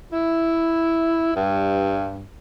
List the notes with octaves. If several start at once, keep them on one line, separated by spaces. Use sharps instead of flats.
E4
G2